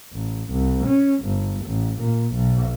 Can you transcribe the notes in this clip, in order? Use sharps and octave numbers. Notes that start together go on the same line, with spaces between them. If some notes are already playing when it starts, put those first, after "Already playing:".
A1
C2
C#4
G1
A1
A#2
B1